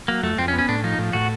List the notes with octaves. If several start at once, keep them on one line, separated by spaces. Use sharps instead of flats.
F#3 A#3
F2 A3
F2 C4
C#4
B3
C#4
A2 D4
F3 D#4
A2
A2 F#4